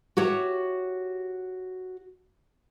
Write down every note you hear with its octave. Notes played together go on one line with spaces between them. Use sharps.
F#4 G4 C#5 E5